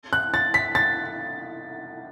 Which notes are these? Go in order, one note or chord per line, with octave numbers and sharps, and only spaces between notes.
F#6
A6
B6
A6